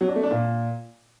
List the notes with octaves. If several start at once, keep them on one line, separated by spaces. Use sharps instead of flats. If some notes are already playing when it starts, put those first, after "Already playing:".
F#3
D4
A3
D4
A#2